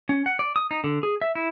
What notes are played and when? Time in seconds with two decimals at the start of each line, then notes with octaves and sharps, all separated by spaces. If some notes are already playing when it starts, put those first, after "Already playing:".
0.09 C#4
0.26 F#5
0.39 D5
0.56 D#6
0.71 D#4
0.84 D3
1.03 G#4
1.22 E5
1.35 E4